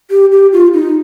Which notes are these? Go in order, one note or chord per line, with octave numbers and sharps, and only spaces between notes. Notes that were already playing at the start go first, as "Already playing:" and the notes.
G4
G4
F4
D#4